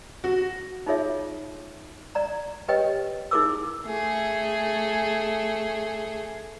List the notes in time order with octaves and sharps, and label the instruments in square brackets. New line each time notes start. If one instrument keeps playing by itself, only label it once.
[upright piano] F#4
[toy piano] D#4 F4 G#4 C#5 E5
D5 A#5
G4 B4 C#5 D#5 G5
D#4 E4 G#4 A#4 D6 E6
[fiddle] A3 G#4